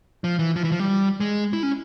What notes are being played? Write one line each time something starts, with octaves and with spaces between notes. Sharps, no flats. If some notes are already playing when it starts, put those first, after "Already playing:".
F3
E3
F3
E3
F3
G3
G#3
E4
C#4